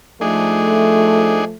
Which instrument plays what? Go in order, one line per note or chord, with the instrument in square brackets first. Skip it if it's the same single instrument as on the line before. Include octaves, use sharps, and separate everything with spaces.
[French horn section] F3 A3 [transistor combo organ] D4 D#4 G#4